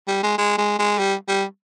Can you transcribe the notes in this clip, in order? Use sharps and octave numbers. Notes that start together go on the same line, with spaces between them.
G3
G#3
G#3
G#3
G#3
G3
G3